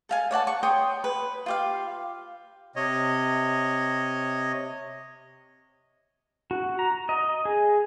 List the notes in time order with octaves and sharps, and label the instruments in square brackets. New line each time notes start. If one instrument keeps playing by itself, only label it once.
[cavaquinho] A4 F5 G#5
C#5 D5 F#5 A5
C#6
C#5 G5 C6 D#6
B4
F4 G4 F5
[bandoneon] C3 C#5 D#5
[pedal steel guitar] F#4
A#5
D#5
G#4